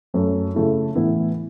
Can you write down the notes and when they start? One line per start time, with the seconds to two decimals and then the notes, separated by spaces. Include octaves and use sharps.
0.14 F#2 F#3 A3
0.54 C#3 A3 E4
0.95 A2 E3 B3 E4